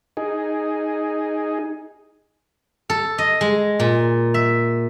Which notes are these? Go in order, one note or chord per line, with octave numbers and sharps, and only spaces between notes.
D#4 G#4
A4
D#5
G#3
A#2
E5